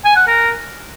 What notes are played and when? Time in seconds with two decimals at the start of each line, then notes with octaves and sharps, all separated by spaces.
0.04 G#5
0.16 F#5
0.27 A#4